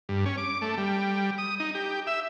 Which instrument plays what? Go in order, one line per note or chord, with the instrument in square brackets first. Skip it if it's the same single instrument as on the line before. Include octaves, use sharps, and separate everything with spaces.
[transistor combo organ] G2
C#4
D6
A3
G3
D#6
D#4
G4
E5